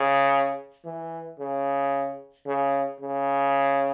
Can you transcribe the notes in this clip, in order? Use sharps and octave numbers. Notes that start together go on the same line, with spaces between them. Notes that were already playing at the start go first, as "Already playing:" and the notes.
Already playing: C#3
E3
C#3
C#3
C#3